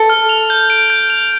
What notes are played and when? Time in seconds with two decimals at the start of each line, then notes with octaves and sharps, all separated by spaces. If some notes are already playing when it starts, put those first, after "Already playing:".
Already playing: A4
0.10 F6
0.29 F7
0.50 G6
0.70 D7
0.90 G6
1.10 F7